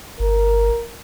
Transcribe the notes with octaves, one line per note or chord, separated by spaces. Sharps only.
G1 A#4